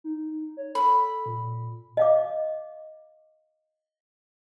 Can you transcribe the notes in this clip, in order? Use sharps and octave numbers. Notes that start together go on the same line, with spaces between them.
D#4
C#5
A4 B5
A#2
D#5 F5 D6